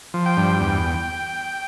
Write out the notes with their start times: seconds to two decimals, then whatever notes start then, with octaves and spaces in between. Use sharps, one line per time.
0.14 F3
0.26 G5
0.37 G2
0.60 E2